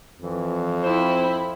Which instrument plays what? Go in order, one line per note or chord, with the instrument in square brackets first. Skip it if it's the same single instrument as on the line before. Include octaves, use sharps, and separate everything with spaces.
[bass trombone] F2 [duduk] E3
[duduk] C4 [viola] E4 [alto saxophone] C5